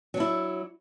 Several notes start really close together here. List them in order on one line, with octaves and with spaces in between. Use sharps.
F#3 D4 E4